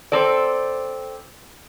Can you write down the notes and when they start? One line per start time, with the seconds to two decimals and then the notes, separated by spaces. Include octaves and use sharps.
0.12 C4 A4 D5